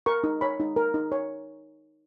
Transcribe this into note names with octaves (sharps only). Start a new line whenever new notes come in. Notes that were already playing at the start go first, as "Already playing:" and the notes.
A#4 C#6
D#4
C#5 B5
D#4
A#4
D#4
C#5